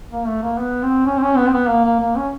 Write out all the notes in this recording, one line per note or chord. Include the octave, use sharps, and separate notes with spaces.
A#3
A3
A#3
B3
C4
C#4
C4
C#4
B3
C4
B3
A#3
A#3
A#3
C#4